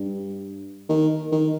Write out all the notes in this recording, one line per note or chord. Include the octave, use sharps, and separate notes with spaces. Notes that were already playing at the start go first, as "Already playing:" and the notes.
Already playing: G2
D#3
D#3